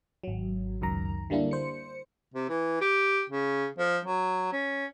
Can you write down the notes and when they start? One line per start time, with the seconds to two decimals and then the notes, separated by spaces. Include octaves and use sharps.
0.24 G#1 F#3
0.81 C#2 F#2 D#3 A#5
1.30 D3 G3 A#3 D4 E4
1.51 C5 C#7
2.34 C3
2.49 E3
2.81 G4
3.30 C#3
3.78 F3
4.05 F#3
4.52 C#4